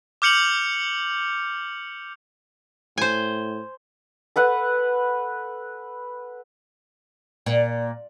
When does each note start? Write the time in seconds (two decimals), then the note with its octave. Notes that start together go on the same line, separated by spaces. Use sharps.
0.22 D6 F6 G6 C#7 F7 F#7
2.98 A2 C5 G#5
4.36 A4 B4 F#5
7.46 A#2